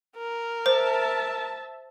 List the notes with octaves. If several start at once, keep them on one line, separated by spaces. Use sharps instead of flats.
A#4
C5 E5 A5